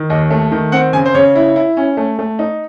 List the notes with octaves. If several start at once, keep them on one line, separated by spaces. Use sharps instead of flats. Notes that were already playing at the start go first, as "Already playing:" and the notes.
Already playing: D#3
D#2 D#5
A3
D#3
C4 F#5
C#3 G#5
C5
C#3 C#5
E4
E4
C#4
A3
A3
D#4